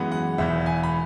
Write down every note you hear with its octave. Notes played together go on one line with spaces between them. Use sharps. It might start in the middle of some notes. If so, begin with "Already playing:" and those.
Already playing: F#2 E3 G#3 B3 F#5
F#5
E1 E2 E3 E5
G#5
B5